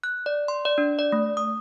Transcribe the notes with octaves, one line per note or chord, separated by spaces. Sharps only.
F#6
D5
C6
D5
D4
D5
A3
D#6